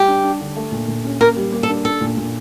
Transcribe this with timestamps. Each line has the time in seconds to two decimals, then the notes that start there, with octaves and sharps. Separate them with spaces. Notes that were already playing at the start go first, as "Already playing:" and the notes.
Already playing: G3 G4
0.08 D4
0.24 D4
0.41 D3
0.56 A3
0.72 A#2
0.88 A#2
1.05 C#4
1.21 A#3 A#4
1.36 G3
1.52 A#3
1.63 A4
1.69 D4
1.85 D4 A4
2.01 A#2
2.17 A#2